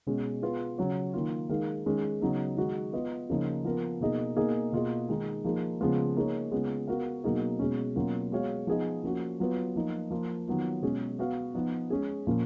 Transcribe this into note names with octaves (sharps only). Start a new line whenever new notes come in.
B2 G#3 C#4
B3 F4 G#4 B4
C#3 F#3 C#4 F#4 C#5
D#3 A#3 F4
D#3 G#3 D#4 A#4 F5
D#3 G#3 C#4
C#3 F#3 B3 D#4
D#3 G#3 D#4 F#4
B3 F4 B4 D#5
C#3 F3 A#3 D#4
F3 B3 F4 A#4
B2 A#3 D#4 G#4 D#5
B2 A#3 D#4 G#4 D#5
B2 A#3 F4 G#4 D#5
D#3 G#3 D#4
F3 A#3 D#4 G#4
C#3 F3 G#3 B3 F4
A#3 D#4 G#4 C#5
C#3 G#3 B3 F4
B3 F#4 A#4 F5
B2 F#3 A#3 D#4 G#4
B2 G#3 C#4
B2 F#3 A#3 C#4 F4
G#3 B3 F#4 C#5 F5
F3 B3 D#4 G#4 D#5
F3 A#3 C#4 F#4
F#3 B3 F4 B4
F3 A#3 D#4
F3 A#3 F4
D#3 F#3 B3 F4
B2 G#3 C#4 G#4
B3 F#4 B4 F5
F3 B3 D#4
G#3 C#4 G#4
A#2 F3 A#3 C#4